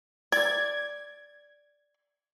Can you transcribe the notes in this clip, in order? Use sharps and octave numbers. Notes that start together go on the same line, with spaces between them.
D5 G#6